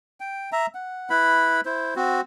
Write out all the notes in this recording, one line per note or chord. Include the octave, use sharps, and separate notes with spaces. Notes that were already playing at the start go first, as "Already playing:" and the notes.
G5
E5 A#5
F#5
E4 B4 B5
E4 C5
C4 F#4